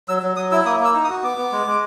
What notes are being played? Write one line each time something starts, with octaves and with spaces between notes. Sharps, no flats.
F#3 E6
F#3
F#3 D#6
E4 E6
A#3 D#6
A#3
E6
D#4
D#6
F#4
B3 D6
B3
G#3
G#3